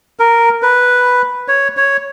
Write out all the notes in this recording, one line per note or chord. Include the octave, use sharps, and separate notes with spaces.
A#4
B4
C#5
C#5